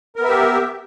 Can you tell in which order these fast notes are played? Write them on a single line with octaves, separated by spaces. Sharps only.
A#4 B3 E5 G4